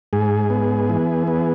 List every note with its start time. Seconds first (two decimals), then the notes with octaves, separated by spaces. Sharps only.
0.13 G#2 G#4
0.50 B3
0.90 E3
1.27 B3